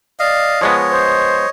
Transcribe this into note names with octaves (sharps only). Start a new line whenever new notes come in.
D5 D#5 F5
F3 G#3 B3 C#5 D#5
C5